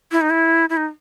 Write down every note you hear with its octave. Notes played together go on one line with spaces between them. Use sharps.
E4
D#4
E4
E4
D#4